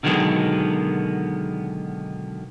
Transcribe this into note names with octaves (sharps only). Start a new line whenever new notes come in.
B2 D3 D#3 F#3 G#3 B3